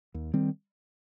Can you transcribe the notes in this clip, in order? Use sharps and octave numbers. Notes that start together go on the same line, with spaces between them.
D#2
D#3 G3 C4